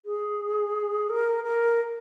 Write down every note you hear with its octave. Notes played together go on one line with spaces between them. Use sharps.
G#4
A#4
A#4